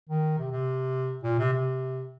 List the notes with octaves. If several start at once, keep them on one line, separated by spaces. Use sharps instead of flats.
D#3
C3
C3
A#2
C3
C3